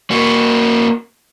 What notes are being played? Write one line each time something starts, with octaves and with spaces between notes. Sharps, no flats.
A#3 F#4